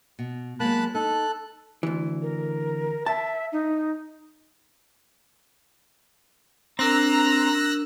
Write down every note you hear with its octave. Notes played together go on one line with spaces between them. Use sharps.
B2
F#3 G#3 A#3 A5 B5 F#6
D#4 A4 F#6
D2 E3
A#4
E5 A5
D#4
C4 D4 A#4 A#5 E6 F#6 A#6